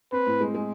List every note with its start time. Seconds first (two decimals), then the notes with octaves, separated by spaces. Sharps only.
0.12 C4 B4
0.26 A2
0.41 G#3
0.54 G#3